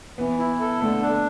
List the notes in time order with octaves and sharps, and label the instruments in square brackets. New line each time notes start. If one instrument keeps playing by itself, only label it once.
[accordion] E3 [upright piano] B3
[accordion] E4
A4
[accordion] D3 [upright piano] A3
[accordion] D4